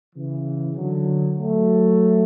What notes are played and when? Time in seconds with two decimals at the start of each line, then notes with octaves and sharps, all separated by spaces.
0.15 C#3 E3
0.76 D3 F#3
1.38 F#3 A3